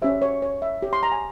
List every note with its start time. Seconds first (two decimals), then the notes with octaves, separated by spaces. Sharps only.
0.02 C#4 G4 C5 E5
0.22 C#5
0.42 C#5
0.62 E5
0.82 G4 C#5
0.93 C6
1.03 A#5
1.12 G#5